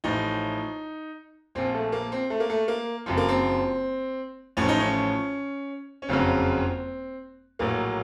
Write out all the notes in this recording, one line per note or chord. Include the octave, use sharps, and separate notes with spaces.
A1 A2 F3 D#4
A#1 A#2 F3 C4
A3
A#3
C4
A3
A#3
A3
A#3
F#1 F#2 F3 C4
A#3
C4
A1 A2 F3 C#4
D#4
C#4
C#4
F#1 F2 C#3 F#3 C4
A#1 A2 F#3 A#3